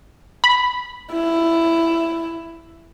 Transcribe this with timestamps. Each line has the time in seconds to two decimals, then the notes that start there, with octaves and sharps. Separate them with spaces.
0.44 B5
1.13 E4